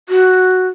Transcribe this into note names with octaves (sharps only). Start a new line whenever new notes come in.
F#4